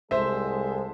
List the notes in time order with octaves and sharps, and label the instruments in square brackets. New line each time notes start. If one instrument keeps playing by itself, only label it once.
[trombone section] C2 G#3 A4 [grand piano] C5 E5